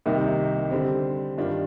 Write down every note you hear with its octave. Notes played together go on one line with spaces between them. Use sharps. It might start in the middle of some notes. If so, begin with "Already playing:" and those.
C2 C3 D#3 A#3 D#4
D3 G3 C4
G2 D#3 G3 D4 F4